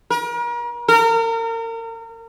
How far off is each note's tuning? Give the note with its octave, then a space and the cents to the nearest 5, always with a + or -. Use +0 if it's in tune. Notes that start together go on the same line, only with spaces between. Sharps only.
A#4 +40
A#4 -35